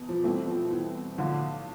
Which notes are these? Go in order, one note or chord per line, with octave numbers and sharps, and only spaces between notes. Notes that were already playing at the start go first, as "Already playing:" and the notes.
Already playing: E2 B2
F3
C2 B2 E3 A3 C4
F3
E3
B1 A2 D3 F3